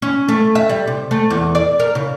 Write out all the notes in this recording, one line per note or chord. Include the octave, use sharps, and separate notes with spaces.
C#4
A3
E5
G3
C3
A3
E2
D5
A#4
C#3